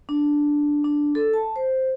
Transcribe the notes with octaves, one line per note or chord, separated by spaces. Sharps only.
D4
D4
A4
A5
C5